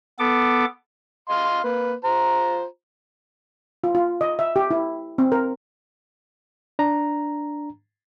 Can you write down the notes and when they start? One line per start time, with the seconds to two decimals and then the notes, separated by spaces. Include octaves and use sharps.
0.19 B3 A4 D6
1.29 D#5 F5 C6
1.64 A#3 B4
2.04 F4 C5 A#5
3.84 F4
3.95 F4
4.21 D#5
4.39 E5
4.56 G4
4.71 E4
5.18 C4
5.32 A#4
6.79 D4 A#5